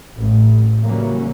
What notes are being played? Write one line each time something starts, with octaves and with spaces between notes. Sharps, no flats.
A1
C#3 E3 F#3 G3 A#3 C#4